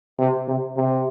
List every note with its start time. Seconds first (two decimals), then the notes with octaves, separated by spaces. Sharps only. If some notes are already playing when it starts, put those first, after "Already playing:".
0.19 C3
0.48 C3
0.77 C3